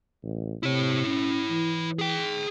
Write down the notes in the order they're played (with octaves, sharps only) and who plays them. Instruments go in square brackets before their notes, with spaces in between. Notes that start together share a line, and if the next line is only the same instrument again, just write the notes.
[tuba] A1
[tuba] C3 [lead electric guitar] E4 C#5
[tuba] C#4
E3
[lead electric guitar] G#4 G5